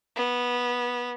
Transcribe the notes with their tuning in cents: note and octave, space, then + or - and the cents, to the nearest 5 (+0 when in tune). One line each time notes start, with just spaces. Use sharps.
B3 -15